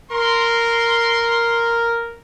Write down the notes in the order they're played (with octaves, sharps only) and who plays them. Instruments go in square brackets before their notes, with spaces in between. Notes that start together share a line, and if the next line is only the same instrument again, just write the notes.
[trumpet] A#4 [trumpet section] C6